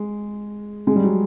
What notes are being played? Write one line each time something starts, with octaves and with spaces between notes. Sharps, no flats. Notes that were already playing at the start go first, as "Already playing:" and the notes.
Already playing: G#3
G#3
G3
F#3